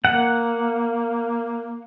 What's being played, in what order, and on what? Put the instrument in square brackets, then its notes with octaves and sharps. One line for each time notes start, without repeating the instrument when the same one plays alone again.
[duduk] A#3 [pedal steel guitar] F#5